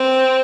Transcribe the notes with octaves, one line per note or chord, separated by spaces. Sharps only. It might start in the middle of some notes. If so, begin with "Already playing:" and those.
Already playing: C4